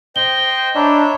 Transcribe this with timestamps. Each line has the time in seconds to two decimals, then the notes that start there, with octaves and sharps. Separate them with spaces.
0.16 C5 D#5 G5 G7
0.75 D4 C#5 D#5 E5 A#5 B5